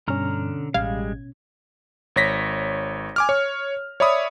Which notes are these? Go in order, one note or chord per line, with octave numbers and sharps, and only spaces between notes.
G2 B2 D3 C#4 A#5 F6
A1 G3 G#3 F5 G#6
G#1 C#5 A#6 B6
G#5 D6 F6
C#5
C#5 D5 E5 B5 D#6